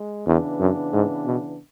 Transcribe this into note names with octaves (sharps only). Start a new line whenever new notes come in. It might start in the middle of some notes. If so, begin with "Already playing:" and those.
Already playing: G#3
E2 C#3 E3 B3 D4
F#2
G#2
B2